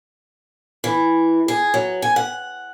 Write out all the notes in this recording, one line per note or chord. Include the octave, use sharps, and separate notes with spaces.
E3
G#4
F#3
G#5
F#5